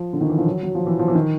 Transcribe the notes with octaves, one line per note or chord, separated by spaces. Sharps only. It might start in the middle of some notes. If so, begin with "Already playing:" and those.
Already playing: F3
D3
D#3
E3
F3
F#3
F#3
F3
E3
F3
E3
D#3